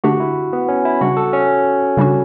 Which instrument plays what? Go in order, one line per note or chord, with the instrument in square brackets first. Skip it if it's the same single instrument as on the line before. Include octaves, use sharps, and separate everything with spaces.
[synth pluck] D3 A3 D4 G4 [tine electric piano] F#4
[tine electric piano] E4
B3
C#4
E4
[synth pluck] C#3 G3 D4 [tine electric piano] F#4
[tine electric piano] A4
C#4
[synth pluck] C#3 G3 D4 F#4